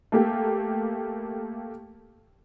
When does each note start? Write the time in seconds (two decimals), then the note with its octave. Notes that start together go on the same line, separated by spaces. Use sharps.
0.12 A3 A#3 G4